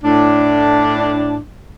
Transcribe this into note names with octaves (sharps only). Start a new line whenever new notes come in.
A2 D4